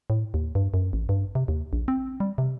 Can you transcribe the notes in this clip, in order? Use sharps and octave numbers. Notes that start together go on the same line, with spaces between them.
A2
D#2
G2
F#2
A1
G2
C3
D#2
A#1
C4
G3
C3